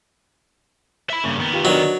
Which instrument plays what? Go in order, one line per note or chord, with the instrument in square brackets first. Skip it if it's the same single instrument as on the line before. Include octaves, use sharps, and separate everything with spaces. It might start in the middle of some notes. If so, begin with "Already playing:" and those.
[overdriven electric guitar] E5 B5
[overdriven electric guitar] G2 C#3 [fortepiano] A#3
[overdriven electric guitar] D#3 B3
[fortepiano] F4 G4
[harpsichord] F#3 [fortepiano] D4 A#4 D#5